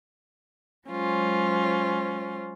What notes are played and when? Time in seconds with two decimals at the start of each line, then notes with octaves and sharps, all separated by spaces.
0.89 F#3 G#3 C#4 F4 C5